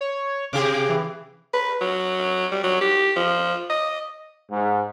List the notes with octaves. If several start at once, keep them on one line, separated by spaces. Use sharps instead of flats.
C#5
C3 G4 G#4 D6
E3
B4
F#3
G3
F#3
G4
F3
D#5
G#2